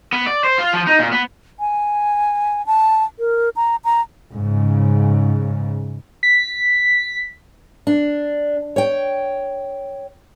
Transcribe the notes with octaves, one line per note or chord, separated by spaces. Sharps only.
B3
D5
C5
F4
F3
D#4
A#2
B3
G#5
A5
A#4
A#5
A#5
G#2 C#3
B6
D4
C#5 G5